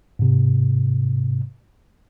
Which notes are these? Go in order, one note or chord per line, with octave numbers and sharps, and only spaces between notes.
G#2 C3